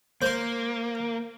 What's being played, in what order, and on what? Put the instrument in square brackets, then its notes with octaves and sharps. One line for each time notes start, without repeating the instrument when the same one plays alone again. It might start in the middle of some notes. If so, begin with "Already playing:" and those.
[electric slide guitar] A#3 [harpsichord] C5 C6